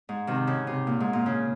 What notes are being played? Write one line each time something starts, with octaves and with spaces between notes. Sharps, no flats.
G#2
C3 D#3
C#3
C3
A#2
G#2
A#2
C#3